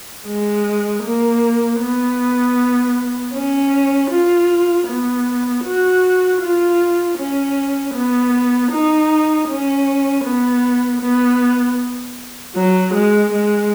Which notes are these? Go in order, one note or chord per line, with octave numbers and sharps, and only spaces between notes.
G#3
A#3
B3
C#4
F4
B3
F#4
F4
C#4
B3
D#4
C#4
B3
B3
F#3
G#3
G#3